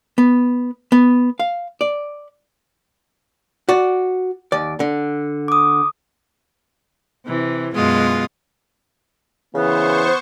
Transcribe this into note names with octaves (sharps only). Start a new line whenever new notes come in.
B3
B3
F5
D5
F#4 D5
D#2 D5
D3
D6 D#6
C3 E3
F#2 B2 G#3 F4 D#6
C#3 E3 B3 C5 C#6